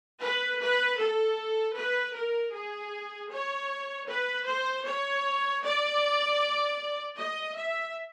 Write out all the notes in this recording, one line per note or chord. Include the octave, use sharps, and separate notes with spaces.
B4
B4
A4
B4
A#4
G#4
C#5
B4
C5
C#5
D5
D#5
E5